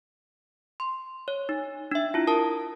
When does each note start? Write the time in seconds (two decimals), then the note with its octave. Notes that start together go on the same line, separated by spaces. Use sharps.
0.80 C6
1.28 C#5
1.49 D#4
1.91 D4 E5
2.14 E4 F4
2.27 A#4 A5 D#6